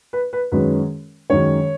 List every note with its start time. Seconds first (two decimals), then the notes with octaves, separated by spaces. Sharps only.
0.13 B4
0.33 B4
0.52 F#2 D#3 G#3 C#4 B4
1.30 F#2 D#3 G#3 C#4 C#5